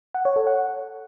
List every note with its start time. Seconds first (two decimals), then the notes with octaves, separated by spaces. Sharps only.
0.14 F#5
0.25 C#5
0.36 A4
0.47 F#5